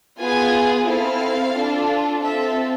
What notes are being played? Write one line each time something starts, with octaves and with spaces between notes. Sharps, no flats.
B3 F4 G#4 G#5
C4 E4 A4 F5
D4 F4 A4
C4 F4 A4 E5